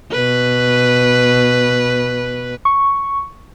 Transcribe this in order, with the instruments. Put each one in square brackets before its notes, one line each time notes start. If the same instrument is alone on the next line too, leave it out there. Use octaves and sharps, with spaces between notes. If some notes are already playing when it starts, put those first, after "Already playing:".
[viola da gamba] B2 B4
[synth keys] C#6